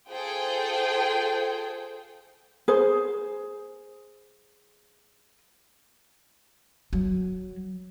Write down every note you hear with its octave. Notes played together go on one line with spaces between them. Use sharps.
F4 G#4 A4 C5 G5
G#4 C5
F#3